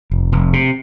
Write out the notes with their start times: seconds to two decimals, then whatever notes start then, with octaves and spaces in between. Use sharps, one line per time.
0.11 F1
0.32 F1
0.53 C3